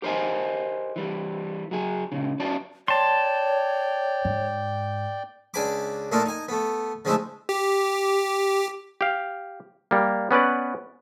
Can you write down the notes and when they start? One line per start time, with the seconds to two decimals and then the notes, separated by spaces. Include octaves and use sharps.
0.02 G4 A#4 C5 D#5 G#5
0.96 E3 G3
1.71 F#3 G#4
2.12 C#2 F#2 A#2 C#3
2.39 F#2 C#4 F#4 D5 A5
2.88 C#5 D5 G5 A5 C6 G6
4.25 G#2
5.54 C#2 D4 G#5 B5 D6
6.12 A#2 A3 A#3 D4 D#4 F4
6.26 D#4 G#5
6.49 A3 B3
7.05 D3 F3 G#3 A3 D#4 E4
7.49 G4
9.01 G4 F5
9.91 G3 A#3
10.31 B3 C#4 B4 D5